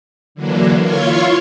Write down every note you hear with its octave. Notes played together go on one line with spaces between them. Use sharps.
D3 E3 F#3 A#3 D4
E4 F4 C#5 F5 C6 C#6